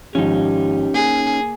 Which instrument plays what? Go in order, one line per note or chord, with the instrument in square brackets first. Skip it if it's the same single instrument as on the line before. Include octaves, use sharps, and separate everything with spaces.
[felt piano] G#1 F3 [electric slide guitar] C#4 D#4 [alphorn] G4
[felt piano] A#3 [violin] G#4